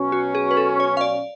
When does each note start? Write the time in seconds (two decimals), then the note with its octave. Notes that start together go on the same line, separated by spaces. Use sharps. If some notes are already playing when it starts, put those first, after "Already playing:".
Already playing: B2 F#3 C#4
0.12 F#4
0.35 G#4
0.51 B4
0.57 A4
0.80 C#5
0.97 F5
1.01 D5